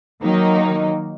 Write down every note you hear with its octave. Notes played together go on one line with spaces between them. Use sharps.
D#3 F#3 A#3 D#4